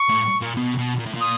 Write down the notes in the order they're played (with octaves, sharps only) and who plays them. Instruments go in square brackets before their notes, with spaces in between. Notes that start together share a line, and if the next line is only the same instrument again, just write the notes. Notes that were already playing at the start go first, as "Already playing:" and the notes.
Already playing: [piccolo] C#6
[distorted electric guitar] A2
A#2
B2
B2
A#2
A2
A#2
[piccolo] D#6